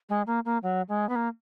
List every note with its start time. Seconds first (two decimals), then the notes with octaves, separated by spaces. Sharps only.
0.09 G#3
0.27 A#3
0.45 A#3
0.63 F#3
0.89 G#3
1.09 B3
1.16 A#3